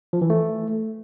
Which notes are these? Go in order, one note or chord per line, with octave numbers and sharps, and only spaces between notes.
F3
E3
A3